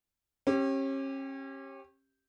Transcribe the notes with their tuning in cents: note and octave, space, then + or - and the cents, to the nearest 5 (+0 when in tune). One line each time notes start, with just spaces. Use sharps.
C#4 -35 G4 +0